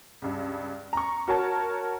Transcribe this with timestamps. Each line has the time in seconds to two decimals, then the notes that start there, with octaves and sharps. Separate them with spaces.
0.22 C#2 G2
0.93 A#5 C#6
1.28 F#4 A#4 C#5 A5